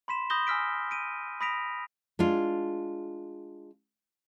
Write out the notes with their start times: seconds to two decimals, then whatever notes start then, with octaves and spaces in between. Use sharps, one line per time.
0.08 B5 C6 B6 E7
0.30 B5 D#6 G6 A#6 G7
0.47 G#5 E6 F6 B6 D7
0.91 D7 D#7
1.41 B5 D#6 A#6 B6 D7 F7
2.19 G#3 D4 F4